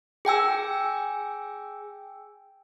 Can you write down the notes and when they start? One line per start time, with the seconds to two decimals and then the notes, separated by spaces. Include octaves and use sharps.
0.25 G#4 G5 G#5 E6